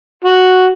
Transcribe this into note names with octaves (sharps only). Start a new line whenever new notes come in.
F#4